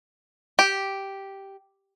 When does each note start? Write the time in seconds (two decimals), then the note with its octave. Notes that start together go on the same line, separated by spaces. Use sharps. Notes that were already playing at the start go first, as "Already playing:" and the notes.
0.59 G4